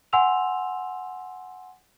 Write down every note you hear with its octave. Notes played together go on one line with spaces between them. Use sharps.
F#5 G#5 C6 E6 F7